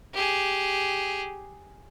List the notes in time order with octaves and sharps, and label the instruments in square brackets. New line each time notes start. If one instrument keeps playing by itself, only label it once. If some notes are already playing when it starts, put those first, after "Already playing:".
[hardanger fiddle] G4 G#4